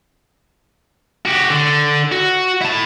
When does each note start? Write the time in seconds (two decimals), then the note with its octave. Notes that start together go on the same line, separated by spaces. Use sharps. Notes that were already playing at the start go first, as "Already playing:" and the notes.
1.25 F#4 G4
1.50 D3
2.12 F#4
2.62 E4 A5